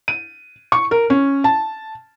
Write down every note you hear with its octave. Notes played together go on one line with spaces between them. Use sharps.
D#7
C#6
A#4
C#4
A5